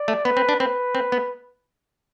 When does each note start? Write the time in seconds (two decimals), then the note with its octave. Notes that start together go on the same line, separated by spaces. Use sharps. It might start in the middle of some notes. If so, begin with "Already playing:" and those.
Already playing: D5
0.08 A3
0.25 B3 B4
0.37 C4
0.49 D4
0.60 C4 B4
0.95 C4
1.12 B3